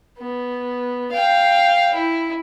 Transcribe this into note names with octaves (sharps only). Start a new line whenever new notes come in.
B3
F5 G5
E4